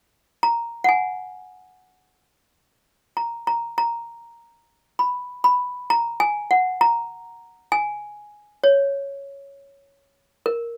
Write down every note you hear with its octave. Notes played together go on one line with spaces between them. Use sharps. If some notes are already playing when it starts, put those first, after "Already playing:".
A#5
F#5
G#5
A#5
A#5
A#5
B5
B5
A#5
G#5
F#5
A#5
G#5
C#5
A#4